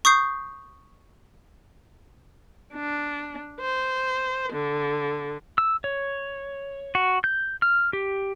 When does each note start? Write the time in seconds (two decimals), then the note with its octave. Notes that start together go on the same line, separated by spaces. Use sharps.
0.05 C#6 D#6 G6 C7
2.74 D4
3.61 C5
4.52 D3
5.58 E6
5.84 C#5
6.95 F#4
7.24 G6
7.62 F6
7.93 G4